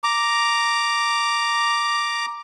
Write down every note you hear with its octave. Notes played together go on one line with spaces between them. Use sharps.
A#5 D6